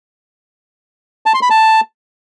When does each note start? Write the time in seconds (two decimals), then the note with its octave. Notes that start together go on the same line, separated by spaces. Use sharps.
1.26 A5
1.34 C6
1.42 B5
1.50 A5